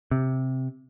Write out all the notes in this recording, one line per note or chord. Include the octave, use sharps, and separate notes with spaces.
C3